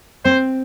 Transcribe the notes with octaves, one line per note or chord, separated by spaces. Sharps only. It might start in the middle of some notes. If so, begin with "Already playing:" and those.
C4 C5